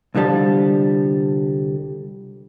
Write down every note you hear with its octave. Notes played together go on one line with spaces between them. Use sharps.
C2 D3 F3 G3 A5